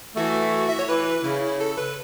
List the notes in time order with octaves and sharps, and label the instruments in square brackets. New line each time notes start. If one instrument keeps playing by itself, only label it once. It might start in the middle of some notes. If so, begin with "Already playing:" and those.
[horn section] E3 A3 [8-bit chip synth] F#4
[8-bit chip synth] E5
C#5
[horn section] E3 [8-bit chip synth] B4
[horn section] C#3 [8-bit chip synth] E4
[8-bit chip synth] A4
B4